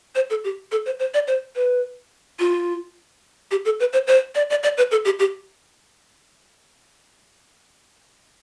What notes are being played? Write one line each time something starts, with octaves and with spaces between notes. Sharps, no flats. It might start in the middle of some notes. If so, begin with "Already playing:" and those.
C5
A4
G4
A4
C5
C5
D5
C5
B4
F4
G4
A4
B4
C5
C5
D5
D5
D5
B4
A4
G4
G4